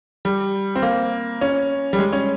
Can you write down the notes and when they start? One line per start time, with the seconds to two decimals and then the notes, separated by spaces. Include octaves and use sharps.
0.25 G3
0.75 C4
0.82 A#3
1.41 C#4
1.93 G3
1.99 G#3
2.13 C#4